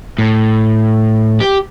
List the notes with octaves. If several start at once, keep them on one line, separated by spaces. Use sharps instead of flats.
A2
G4